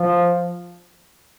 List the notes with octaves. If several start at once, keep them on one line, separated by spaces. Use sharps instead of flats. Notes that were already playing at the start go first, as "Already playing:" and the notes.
Already playing: F3